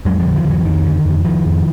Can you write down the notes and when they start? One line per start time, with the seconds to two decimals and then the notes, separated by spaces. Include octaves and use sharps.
0.05 F2 F#3 G#3
0.20 F3 G3
0.25 D3
0.35 D#3 F3
0.45 F2
0.50 E3 F#3
0.65 F2 D#3
0.86 D3
1.05 F2
1.25 F2 D#3 F3
1.45 F2